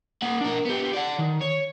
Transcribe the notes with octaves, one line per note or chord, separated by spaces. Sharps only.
A#3 F#5
D4 A#4
B3 G4
D5 F#5
D#3
C#5